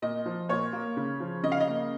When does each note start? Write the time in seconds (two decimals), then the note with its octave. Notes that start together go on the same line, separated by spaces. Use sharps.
0.02 A#2 D#5
0.26 F3
0.49 A#2 C#5
0.73 A#3
0.97 C#3
1.20 F3
1.43 C#3 D#5
1.52 F5
1.60 D#5
1.67 A#3